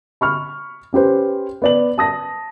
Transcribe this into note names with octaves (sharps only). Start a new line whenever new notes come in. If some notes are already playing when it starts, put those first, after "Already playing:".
B5 C#6 F6
C#4 G4 B4 C5
B3 D5 F#7
A5 D#6 A#6